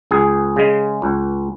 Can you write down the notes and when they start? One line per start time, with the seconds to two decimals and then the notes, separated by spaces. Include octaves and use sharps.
0.11 C#2 G#4
0.56 C#3 G#3
1.02 C#2